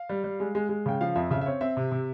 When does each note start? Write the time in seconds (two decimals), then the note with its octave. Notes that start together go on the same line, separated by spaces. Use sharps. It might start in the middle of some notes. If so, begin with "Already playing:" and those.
Already playing: F5
0.09 G3
0.24 G3
0.40 G#3
0.55 G#3
0.69 G#3
0.86 C#3 G5
1.01 F3 F5
1.15 F2 E5
1.31 C#3 E5
1.41 E5
1.46 C4 C#5
1.61 C4 E5
1.77 C3
1.91 C3